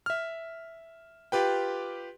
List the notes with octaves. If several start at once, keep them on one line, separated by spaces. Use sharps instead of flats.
E5 F6
F4 G4 B4 G5